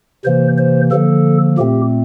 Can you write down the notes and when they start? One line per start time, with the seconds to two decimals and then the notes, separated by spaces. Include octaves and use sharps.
0.25 C3 E3 A#3 C5
0.58 C5
0.91 D3 F3 A#3 A4
1.58 A#2 A3 C4 G4